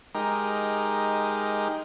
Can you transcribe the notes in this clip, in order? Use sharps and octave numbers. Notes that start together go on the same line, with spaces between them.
G#3 D#4 G4 A#4